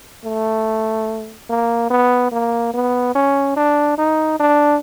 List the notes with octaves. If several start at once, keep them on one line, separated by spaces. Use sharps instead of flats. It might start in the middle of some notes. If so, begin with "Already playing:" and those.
A3
A#3
B3
A#3
B3
C#4
D4
D#4
D4